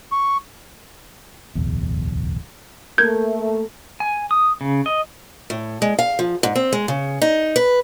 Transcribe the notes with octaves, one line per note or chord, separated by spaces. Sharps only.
C#6
D1 B1 E2
A3 A#3 A#4 G6 G#6
G#5
D#6
C#3
D#5
A2
G#3
F5
F3
G#2
C4
G#3
C#3
D#4
B4